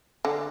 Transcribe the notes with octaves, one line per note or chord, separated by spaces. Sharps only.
D3